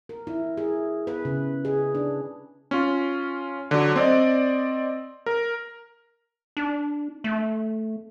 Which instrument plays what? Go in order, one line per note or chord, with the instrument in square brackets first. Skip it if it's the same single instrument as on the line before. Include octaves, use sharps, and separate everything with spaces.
[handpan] A#4
E4
G#4
B4
C#3
G#4
D4
[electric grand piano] C#4 F4
D3 F#3
C4 D5 D#5
A#4
[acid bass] D4
A3